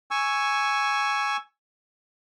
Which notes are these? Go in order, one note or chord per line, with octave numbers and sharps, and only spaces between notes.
G#5 C#6 E6